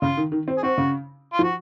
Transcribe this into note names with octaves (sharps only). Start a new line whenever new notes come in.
C#3 F4
D#3
D#3
C4
G#4
C4 F#4
C#3
F4
F3
F#4